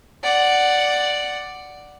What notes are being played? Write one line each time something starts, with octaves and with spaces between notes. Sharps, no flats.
D5 F#5